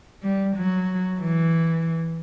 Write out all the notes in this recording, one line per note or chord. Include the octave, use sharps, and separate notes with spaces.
G3
F#3
E3